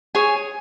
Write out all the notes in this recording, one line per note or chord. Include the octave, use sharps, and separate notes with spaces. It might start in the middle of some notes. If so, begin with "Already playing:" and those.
G#4 C#5 G#5